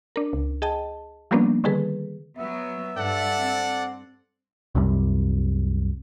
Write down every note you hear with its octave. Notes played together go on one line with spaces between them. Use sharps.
D4 A#4
C#2
G#4 D#5 G5 A5
F3 G3 A#3 B3 C#4 D4
D3 D#3 G3 G#4 A4 B4
F#3 B3 E5
G2 A4 D5 F#5
C4
C2 F#2 C3 G3